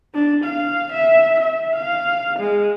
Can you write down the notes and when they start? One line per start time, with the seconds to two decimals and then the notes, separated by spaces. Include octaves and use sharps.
0.15 D4
0.44 F5
0.92 E5
1.40 E5
1.76 F5
2.39 G#3